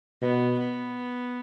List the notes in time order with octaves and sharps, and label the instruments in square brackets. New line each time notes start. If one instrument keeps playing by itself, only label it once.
[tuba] B2 [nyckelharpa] B3
[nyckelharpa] B3